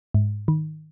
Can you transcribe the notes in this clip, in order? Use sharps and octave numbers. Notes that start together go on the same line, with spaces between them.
G#2
D#3